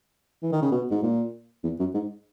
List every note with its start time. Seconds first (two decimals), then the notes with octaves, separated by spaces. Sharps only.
0.43 E3
0.52 D#3
0.62 C#3
0.72 B2
0.91 G#2
1.03 A#2
1.64 E2
1.79 F#2
1.94 G#2